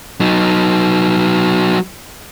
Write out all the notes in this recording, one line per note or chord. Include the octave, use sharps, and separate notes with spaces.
F#3 D#4